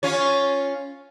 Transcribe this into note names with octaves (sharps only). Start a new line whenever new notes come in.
C#4 F4 C#5